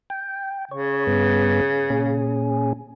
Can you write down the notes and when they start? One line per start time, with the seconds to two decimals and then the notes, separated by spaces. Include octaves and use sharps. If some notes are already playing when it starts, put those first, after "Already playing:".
0.10 G5
0.71 C#3 C#5
1.07 G2 B3
1.90 A#2 C#4 G#4